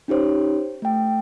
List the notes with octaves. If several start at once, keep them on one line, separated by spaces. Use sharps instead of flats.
C#4 D#4 G4 C5 C#5
A3 G5